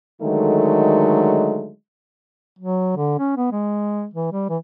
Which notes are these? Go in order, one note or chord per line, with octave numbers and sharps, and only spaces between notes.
D3 D#3 F#3 G#3 A3 D#4
F#3
D3
C#4
B3
G#3
E3
G3
E3